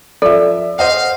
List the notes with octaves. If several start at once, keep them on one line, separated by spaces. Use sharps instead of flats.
F3 A4 D5 E5
C5 D#5 F5 F#5